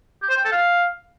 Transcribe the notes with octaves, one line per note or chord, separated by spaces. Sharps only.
G4
C5
G5
A4
F5